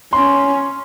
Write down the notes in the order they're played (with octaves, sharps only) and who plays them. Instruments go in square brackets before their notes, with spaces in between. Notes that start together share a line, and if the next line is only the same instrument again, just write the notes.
[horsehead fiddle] C#4 [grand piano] C6